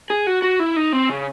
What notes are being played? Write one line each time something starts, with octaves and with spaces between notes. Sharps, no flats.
G#4
F#4
F#4
E4
D#4
C4
C#3